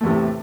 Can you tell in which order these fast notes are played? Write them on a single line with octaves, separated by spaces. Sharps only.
A3 E2 C3 A2